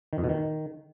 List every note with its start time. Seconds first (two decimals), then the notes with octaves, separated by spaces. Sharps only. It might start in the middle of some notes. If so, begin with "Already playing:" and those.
0.13 D#3
0.18 F2
0.24 B2
0.29 D#3